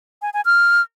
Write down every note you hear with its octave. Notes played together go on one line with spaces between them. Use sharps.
G#5
G#5
F6